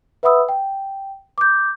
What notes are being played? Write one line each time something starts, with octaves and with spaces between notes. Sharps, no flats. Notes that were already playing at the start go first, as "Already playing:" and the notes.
B4 E5 F#5 B5 D#6 E6
G5
D6 G6